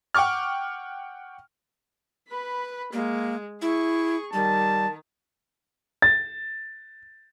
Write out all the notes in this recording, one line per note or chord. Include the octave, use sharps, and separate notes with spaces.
F#5 G5 C#6 D6 F6
B4 B5
G#3 A#3
E4 G#4 C#6
D#3 G3 A5
A6